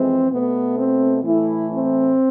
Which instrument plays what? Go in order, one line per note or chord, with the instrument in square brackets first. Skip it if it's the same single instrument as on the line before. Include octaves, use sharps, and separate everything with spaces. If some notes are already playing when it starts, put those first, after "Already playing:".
Already playing: [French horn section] F2 E3 G#3 C4
B2 A3 B3
C4
A2 E3 A3 E4
C4